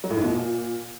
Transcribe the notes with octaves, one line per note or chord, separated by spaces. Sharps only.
F#3
A2
G#2
B2
A#2